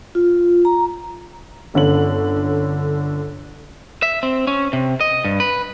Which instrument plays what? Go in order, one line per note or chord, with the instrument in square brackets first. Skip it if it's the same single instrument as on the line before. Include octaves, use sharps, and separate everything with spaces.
[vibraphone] F4
A#5
[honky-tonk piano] G1 D3 C#4 F#7
[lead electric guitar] E5
C4
C#4
C3
D#5
G2
B4